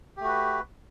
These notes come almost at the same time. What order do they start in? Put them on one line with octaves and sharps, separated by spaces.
G4 A3 F#4 B4